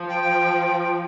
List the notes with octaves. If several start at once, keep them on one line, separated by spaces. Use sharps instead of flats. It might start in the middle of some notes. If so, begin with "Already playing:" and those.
Already playing: F3
G5